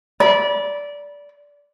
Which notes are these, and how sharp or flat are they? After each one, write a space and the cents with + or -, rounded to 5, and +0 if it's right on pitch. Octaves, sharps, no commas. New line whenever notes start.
D5 -15 B5 -30